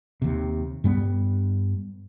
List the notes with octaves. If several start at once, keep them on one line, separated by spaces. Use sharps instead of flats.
D#2 C3
G2 G3 B3